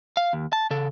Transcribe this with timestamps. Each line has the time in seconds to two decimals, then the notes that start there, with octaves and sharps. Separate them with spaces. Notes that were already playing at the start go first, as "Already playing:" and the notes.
0.17 F5
0.33 D#2
0.53 A5
0.71 C#3 A4